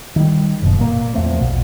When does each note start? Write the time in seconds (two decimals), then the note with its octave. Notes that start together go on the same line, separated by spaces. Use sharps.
0.16 D#3 G3
0.62 F#1 B2
0.78 A#2 A#3
1.14 E2 F3 A3 C4
1.41 A#1 B2